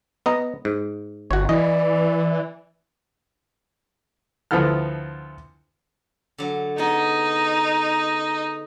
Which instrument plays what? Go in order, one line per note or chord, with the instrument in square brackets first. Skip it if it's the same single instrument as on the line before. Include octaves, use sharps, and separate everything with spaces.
[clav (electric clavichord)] B3 D#5 A#5
G#2
[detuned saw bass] G1 [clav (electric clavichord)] F#4 C#5
[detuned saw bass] E3 [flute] D5 [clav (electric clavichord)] D#5
[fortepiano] D2 F3 B3 E4 A4 F6
[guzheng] D3 F#3
[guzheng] B3 G#4 [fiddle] D#4